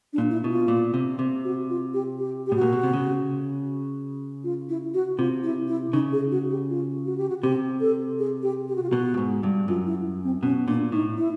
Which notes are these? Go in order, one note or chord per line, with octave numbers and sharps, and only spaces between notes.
D4
A#2
E4
B2
F4
A#2
C3
C3
F#4
F4
G4
G4
G4
A2 F#4
A#2
B2
C3
C#3
F4
E4
F#4
C3 F4
E4
E4
C#3 D#4
G#4
F#4
G4
F4
F#4
G4
F#4
C3 G4
A4
G#4
G4
G4
F#4
F4
B2 F#4
A2
G#2
G2
F#2 F4
E4
C4
B2 C#4
A#2 D4
A2 D#4
E4